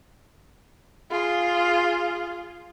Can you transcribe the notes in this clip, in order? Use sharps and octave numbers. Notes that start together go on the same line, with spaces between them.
F4 G#4